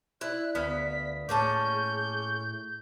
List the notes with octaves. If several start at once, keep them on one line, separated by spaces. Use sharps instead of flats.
E4 D5 F#6
D2 B3 E5 F5 B6
A2 A#3 C#4 G#4 A5 G6